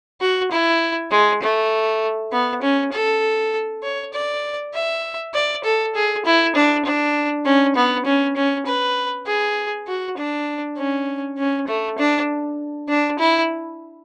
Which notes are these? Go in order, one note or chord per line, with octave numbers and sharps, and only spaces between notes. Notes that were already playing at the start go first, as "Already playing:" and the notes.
F#4
E4
G#3
A3
B3
C#4
A4
C#5
D5
E5
D5
A4
G#4
E4
D4
D4
C#4
B3
C#4
C#4
B4
G#4
F#4
D4
C#4
C#4
A3
D4
D4
E4